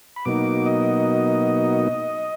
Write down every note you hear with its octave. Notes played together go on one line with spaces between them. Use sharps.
B5
B2 F#3 A#3 D#4 D6
D#5